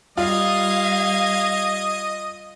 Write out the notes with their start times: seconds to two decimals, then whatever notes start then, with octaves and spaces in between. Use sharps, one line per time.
0.18 G3 F4 D#5 F5 G#6